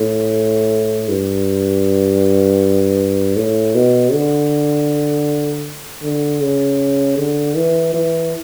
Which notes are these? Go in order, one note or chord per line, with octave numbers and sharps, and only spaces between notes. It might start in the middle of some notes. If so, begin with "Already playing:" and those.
Already playing: A2
G2
A2
B2
D3
D3
C#3
D3
E3
E3